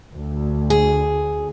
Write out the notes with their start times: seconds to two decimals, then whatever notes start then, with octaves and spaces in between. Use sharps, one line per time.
0.12 D2
0.70 G#4